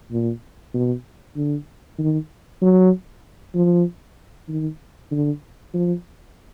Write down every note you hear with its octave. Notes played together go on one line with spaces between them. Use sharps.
A#2
B2
D3
D#3
F#3
F3
D#3
D3
F3